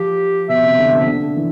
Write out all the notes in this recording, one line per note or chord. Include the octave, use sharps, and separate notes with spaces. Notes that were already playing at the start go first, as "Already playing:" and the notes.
Already playing: F3 G4
B2 E5
C3
D3
F3
D3
E3